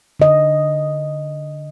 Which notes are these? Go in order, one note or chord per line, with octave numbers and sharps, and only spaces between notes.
D3 D#5